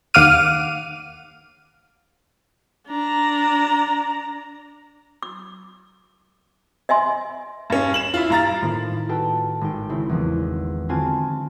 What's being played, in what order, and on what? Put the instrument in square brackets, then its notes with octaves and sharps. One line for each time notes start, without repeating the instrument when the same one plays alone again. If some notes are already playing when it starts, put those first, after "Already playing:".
[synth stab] D#2 F5 F#5 D6 F6 D#7
[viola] D4 A#5
[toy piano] D6
D#5 E5 G#5 C6
[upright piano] G2 C#4
E7 F#7
E4 F4
G2 A#5 A6
[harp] A2 D#3 A#3 F4 C5
F4 F#4 A4 B4 G5 A5
G#1 G5
C#3 C4 E4
E2 D#3 F3
D3 C4 F4 F#4 G#5 A5